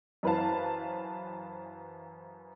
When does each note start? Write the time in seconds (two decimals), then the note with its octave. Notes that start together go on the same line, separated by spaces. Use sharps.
0.23 F#2 E3 B4 C5 F5 A5